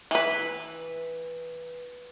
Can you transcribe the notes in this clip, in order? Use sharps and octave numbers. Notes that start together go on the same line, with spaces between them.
E3 B4